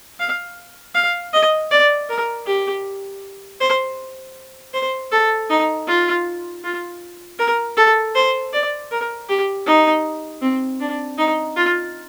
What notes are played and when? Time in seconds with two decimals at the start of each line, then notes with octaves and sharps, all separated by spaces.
0.20 F5
0.95 F5
1.33 D#5
1.71 D5
2.09 A#4
2.47 G4
3.60 C5
4.74 C5
5.12 A4
5.50 D#4
5.88 F4
6.64 F4
7.39 A#4
7.77 A4
8.15 C5
8.53 D5
8.91 A#4
9.29 G4
9.66 D#4
10.42 C4
10.80 D4
11.18 D#4
11.56 F4